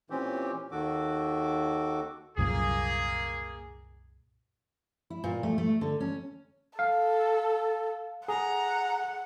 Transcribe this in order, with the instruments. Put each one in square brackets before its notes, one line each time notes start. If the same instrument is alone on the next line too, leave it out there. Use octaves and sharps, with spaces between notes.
[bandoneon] A#2 E3 C4 C#4 G4
D#2 D#3 F#4 A4 D6
[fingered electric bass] C2 F#2 A#2 [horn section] A#3 G#4
[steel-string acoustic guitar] E4
A#2
A3
A3
D3
C#4
[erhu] A4 [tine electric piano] F5
[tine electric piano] G#4 [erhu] F#5 [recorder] A#5